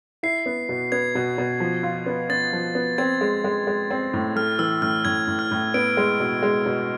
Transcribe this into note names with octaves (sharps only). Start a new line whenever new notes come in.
E4 C7
B3
B2
B3 G#6
B2
B2
F3
F4
B3
B3 A6
F3
B3
C4 G#6
G#3
G#3
G#3
C4
A2
A3 F6
E3 E6
A2 F6
A2 G#6
A2
F6
A2
B3 D7
G#3
B2
G#3
B2